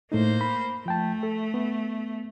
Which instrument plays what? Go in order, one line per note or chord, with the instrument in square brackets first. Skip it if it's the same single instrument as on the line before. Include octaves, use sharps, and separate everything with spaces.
[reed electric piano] A2 A3 D#4 [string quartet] A#3 C5
[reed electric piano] B5
[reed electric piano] F3 G5 A5 [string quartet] A3
[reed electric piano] A4
B3